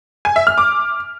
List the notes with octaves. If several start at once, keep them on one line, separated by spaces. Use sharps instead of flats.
G#5
E5
F6
D6